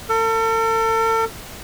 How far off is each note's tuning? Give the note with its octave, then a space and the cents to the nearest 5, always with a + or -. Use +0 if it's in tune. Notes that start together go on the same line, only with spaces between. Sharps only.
A4 +40